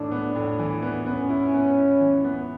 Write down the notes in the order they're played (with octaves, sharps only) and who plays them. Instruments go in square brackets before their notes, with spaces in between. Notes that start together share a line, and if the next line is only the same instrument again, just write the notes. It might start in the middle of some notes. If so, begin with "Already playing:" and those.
Already playing: [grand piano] A2 E3 [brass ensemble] D4
[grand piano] B3
A2
E3
B3
[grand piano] B3 [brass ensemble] C#4
[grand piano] E4
B3
E4
E3
B3